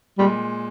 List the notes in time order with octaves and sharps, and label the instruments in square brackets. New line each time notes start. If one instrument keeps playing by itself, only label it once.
[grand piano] A#2 G#3 [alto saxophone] G3